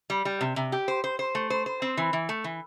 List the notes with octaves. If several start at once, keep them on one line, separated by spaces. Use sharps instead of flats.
G3
G3
C3
C3
G4
C5
C5
C5
A3
C5
C5
C4
E3
E3
A3
E3